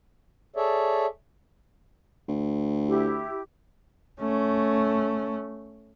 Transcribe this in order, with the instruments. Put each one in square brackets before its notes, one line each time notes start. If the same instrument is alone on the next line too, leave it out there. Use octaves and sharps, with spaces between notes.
[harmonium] G#4 A4 C#5 D5 E5
[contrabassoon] D2
[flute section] E4 G4
[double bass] A3 C#4